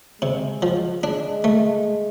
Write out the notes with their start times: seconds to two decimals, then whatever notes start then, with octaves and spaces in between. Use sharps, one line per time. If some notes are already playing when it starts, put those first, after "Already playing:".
0.22 C3 G#3
0.62 F3
1.03 G#3 D4
1.44 A3